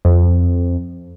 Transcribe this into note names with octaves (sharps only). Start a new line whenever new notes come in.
F2